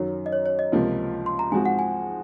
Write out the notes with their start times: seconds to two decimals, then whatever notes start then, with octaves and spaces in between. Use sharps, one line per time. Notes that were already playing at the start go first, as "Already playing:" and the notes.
Already playing: F#2 D#3 F#3 C#5
0.26 D#5
0.32 C#5
0.46 C#5
0.59 D#5
0.72 C#2 C3 F3 A#3 F4
1.26 C6
1.39 A#5
1.52 G#2 F3 G#3 C4 F#4 G#5
1.66 F#5
1.79 G#5